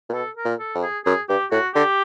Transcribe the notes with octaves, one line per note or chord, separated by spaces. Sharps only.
A#2
B2 A4
A#4
A#2
A4
F2
G#4
F#2 G#4
G2 G4
A2 F#4
D3 G4